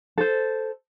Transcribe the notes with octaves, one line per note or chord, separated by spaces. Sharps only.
A4 C5